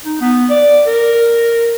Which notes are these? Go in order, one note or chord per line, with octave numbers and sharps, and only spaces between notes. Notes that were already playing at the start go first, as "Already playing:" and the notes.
D#4
B3
D5
A#4